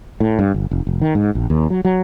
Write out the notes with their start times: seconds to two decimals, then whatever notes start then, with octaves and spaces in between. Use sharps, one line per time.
0.20 A2
0.39 G2
0.54 G1
0.71 F1
0.87 F1
1.01 D#3
1.15 G#2
1.35 A#1
1.50 D#2
1.70 F#3
1.85 F#3